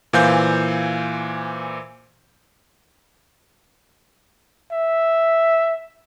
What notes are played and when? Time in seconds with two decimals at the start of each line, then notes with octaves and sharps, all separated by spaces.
0.13 A#2 E3 C5 F5 G#5 G6
4.72 E5